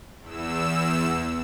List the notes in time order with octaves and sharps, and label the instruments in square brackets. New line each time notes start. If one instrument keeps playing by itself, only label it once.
[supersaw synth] E2 E6